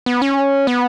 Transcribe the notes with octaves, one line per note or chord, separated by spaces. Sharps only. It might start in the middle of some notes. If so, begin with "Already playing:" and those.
B3
C#4
B3